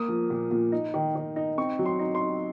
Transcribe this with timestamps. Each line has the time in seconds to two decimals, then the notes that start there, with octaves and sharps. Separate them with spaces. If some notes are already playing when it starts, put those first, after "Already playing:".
Already playing: A#3 D#6
0.09 F3
0.30 A#2
0.51 A#2
0.72 D#4
0.94 D#3
1.15 D#3
1.36 D#4
1.58 C4 C#6
1.79 F#3
1.86 C6
1.99 D#4
2.15 C6
2.21 D#4